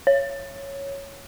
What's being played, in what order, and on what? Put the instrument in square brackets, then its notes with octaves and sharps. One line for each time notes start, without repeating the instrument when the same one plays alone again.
[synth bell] C#5